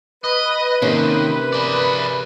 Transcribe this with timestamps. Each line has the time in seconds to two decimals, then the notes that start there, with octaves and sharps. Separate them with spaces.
0.24 B4 D#5
0.82 C3 D#3 A#3 C#4
1.53 G#4 D5